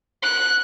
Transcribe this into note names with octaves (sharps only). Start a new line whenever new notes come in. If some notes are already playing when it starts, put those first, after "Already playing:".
F#6